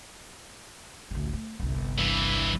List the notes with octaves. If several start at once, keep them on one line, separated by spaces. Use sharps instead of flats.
A1 D2
A3
G1 C2
G2 E3